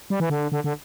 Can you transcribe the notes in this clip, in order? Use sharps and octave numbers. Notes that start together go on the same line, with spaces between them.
G3
E3
D3
D3
D3